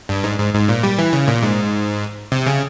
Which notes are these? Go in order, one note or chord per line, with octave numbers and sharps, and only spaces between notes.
G2
G#2
G#2
G#2
A#2
G3
E3
C#3
A#2
G#2
C3
C#3